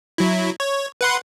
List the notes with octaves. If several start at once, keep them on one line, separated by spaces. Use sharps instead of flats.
F#3 E4
C#5
B4 F#5 C6